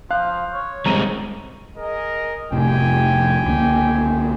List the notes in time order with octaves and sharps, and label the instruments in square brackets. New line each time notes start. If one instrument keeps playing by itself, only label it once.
[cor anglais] F3 [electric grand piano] F5 F#6
[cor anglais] C#5
[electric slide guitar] G3 G#3 C4 [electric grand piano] A#5 D#7
[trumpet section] G#4 A#4 D#5
[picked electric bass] F1 A2 C3 [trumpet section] G4 G5 G#5
[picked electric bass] C#2 D3 A#3